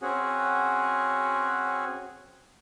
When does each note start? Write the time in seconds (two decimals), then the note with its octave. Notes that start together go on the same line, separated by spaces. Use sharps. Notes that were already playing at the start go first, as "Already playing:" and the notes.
0.01 C4 C#4 F#4 G#4